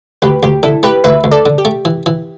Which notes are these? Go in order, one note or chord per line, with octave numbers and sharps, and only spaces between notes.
D2 G4 B4
D2 G4
D3 E4 A4
A3 G4 B4
D2 B4 E5
D2
A4 D5
D3
G4
A3
E3
E3